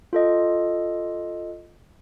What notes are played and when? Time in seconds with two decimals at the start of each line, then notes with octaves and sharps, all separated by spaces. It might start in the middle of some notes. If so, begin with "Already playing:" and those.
0.13 F4 A4 D#5